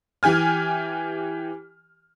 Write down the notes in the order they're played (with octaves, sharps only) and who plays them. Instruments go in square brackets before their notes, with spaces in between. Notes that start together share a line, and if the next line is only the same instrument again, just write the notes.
[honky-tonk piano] E3 G4 G#5 F6